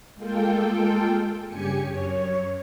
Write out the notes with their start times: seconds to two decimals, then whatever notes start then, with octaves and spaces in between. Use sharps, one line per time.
0.15 G#3 A#3 F4 A4 G5
1.47 G2 C#3 G4 G#5 C#7
1.80 F#2 C#5